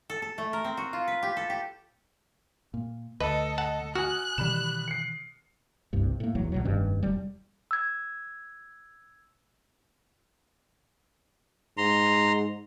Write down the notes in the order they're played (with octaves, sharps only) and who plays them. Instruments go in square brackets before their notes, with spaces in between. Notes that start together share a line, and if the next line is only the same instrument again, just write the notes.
[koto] A4
A4
A3
A#4
C4
F#4
F4
B4
G4
A4
G4
[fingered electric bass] A#2
[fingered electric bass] D2 [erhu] A4 [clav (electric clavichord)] B4 [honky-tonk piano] D#5
[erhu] A4 [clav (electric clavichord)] F#5 A5
[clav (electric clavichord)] F#4 [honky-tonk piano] G#5 D#6 F6 [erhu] F#6
[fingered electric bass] B2 D#3 E3 [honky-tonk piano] G3 B5 E7
[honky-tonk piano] C7 C#7
[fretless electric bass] F#1 C2 G2
A2 A#3
A#1 E2 F#3
A#1 B2 F#3
F1 G2 D#3 C#4
E1 G3
[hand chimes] E6 G#6
[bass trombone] G#2 [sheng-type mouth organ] A#5 C6